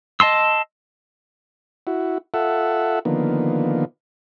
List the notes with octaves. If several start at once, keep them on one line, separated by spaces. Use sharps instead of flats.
D#5 A5 C6 E6
E4 F#4
F4 A4 E5 F#5
D3 D#3 F3 A#3 B3